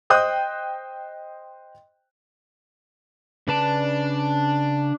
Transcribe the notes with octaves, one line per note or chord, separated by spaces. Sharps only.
C5 D#5 G5 D#6 F#6 G6
C#3 D4 B4 A5